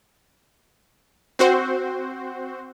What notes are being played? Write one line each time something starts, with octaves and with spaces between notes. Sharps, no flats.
C4 F#4 C5